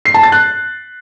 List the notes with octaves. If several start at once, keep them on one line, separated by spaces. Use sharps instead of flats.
C7
A5
A6
F#6